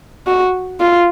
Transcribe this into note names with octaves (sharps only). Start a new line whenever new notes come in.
F#4
F4